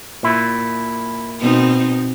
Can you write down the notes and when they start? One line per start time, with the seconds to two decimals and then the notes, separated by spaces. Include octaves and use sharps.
0.23 A#2 E4
1.40 B2 C4 D#4